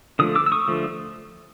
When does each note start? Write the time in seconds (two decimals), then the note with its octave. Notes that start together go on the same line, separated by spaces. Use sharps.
0.19 D3 F3 A3 D#6
0.35 D6 E6
0.46 E6
0.52 C#6 D#6
0.68 D3 F3 A3